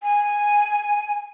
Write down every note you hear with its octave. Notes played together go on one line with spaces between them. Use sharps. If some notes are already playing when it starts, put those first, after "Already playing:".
G#5